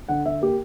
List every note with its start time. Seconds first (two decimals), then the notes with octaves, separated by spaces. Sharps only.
0.09 D3 F#5
0.26 D3 E5
0.41 A#3 G4